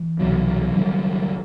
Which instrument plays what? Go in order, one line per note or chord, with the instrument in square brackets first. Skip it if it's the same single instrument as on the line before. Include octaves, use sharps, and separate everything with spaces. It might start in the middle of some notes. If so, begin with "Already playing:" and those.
Already playing: [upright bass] E3
[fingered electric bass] C2 B2 F#3
F#1 F#2 D#3 G3